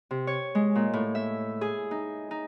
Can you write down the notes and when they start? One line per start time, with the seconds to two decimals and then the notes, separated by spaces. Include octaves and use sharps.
0.11 C3
0.27 C#5
0.55 G#3
0.75 A#2
0.93 A2
1.15 E5
1.61 G#4
1.91 D#4
2.31 D#4